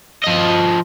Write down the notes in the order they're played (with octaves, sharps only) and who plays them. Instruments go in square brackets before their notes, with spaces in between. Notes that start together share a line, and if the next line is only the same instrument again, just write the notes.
[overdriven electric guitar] F3 D#5